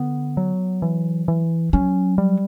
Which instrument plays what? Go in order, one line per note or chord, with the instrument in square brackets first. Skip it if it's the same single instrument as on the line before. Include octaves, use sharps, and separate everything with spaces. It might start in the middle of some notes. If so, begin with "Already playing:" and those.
Already playing: [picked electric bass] D3 B3
F#3
E3
E3
[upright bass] F#3 [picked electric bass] C#4
[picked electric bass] G3